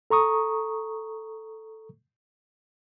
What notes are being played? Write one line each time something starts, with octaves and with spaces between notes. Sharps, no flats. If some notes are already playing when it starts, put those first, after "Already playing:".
A4 A#5 C#6 D#6